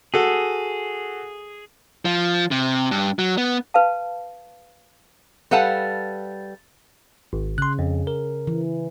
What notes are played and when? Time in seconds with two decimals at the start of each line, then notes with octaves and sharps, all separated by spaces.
0.14 F#4 G#4 A4
2.05 F3
2.51 C3
2.91 G2
3.19 F#3
3.38 B3
3.74 B4 F5 A5
5.51 G3 A4 B4 F5 F#5 A5
7.33 G#1
7.58 C#3 C6 F#6
7.79 F2
8.07 A#4
8.47 E3